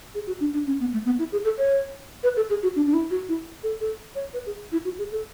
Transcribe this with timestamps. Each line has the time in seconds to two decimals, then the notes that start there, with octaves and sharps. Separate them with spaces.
0.15 G#4
0.27 F#4
0.40 D4
0.53 D4
0.67 C#4
0.80 B3
0.93 A3
1.05 B3
1.19 E4
1.32 G#4
1.44 A4
1.58 C#5
2.23 B4
2.36 A4
2.49 G#4
2.63 F#4
2.76 D4
2.87 D4
2.94 E4
3.11 F#4
3.29 E4
3.63 A4
3.81 A4
4.15 C#5
4.34 B4
4.46 G#4
4.72 E4
4.85 F#4
4.98 G#4
5.12 A4